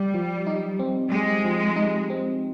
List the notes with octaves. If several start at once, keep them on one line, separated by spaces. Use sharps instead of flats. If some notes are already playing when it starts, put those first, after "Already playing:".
Already playing: G3 G4
F3
D#4
C4
G#3 G4
F3
D#4
C4